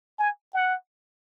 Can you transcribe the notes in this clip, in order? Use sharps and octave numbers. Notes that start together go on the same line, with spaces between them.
G#5
F#5